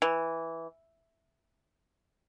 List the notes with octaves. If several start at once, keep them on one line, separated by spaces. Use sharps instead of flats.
E3